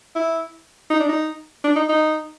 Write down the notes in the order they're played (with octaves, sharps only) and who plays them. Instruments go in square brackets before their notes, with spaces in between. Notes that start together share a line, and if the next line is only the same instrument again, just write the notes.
[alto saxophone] E4
D#4
D4
D#4
D4
D#4
D#4